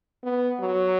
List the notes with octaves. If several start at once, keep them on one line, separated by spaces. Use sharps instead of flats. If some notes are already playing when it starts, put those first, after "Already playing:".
B3
F#3